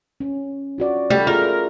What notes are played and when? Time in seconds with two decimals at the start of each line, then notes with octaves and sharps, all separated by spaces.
0.20 C#4
0.78 F4 F#4 D5
1.10 G3 A3
1.27 F4 G#4 A#4